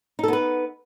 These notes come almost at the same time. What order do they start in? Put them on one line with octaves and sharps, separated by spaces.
D#4 A4 B3 B4